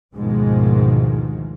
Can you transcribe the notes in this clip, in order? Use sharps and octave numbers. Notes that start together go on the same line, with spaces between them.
D2 G#2 B2 D#3 F3 G#3